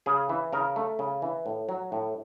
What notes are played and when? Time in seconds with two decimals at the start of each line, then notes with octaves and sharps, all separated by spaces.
0.06 C#3 G#4
0.29 E3
0.53 C#3 A#4
0.76 A3
0.99 C#3
1.22 E3
1.46 A2
1.69 F#3
1.92 A2